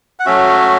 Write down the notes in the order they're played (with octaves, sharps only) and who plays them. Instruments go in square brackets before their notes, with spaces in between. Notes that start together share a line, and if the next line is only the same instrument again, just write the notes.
[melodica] F#5
F#3 A3 C#4 F#4 E5